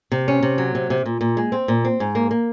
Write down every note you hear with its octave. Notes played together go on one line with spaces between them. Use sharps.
C3
C#4
C3
F#3
C3
C3
A#2
A#2
G#3
C4
A#2
C4
G#2
A#3
A#3